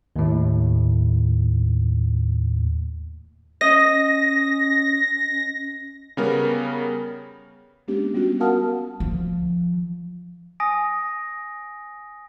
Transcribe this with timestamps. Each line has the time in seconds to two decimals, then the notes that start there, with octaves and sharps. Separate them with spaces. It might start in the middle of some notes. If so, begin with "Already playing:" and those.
0.16 D#2 A2
3.61 C#4 D#5 A#6
6.17 C#3 G3 B3 A#4
7.88 G#3 A#3 B3 C#4 D4 G4
8.14 G3 B3 C#4 F4 F#4
8.40 A#4 F5 F#5 A5 D#6 F6
9.00 F3
10.60 G#5 D#6 A#6 D7